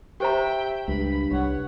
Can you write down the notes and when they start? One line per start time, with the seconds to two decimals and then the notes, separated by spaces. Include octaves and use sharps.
0.20 G4 C5 E5 G5 A#5
0.88 C#2 G2 B5
1.31 C2 C#5 F#5